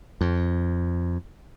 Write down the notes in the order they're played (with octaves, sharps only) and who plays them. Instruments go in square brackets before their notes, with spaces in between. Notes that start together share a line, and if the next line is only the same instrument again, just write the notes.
[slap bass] F2